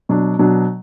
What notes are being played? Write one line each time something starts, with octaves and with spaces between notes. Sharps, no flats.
B2 F#3 D4
B2 F#3 D4